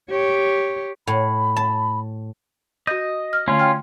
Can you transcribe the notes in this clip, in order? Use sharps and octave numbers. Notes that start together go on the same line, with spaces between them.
G4 C#5
A2 B5
A5
F#4 D#5 G6
F6
D3 A3 C#4 F4
G5 C6 F6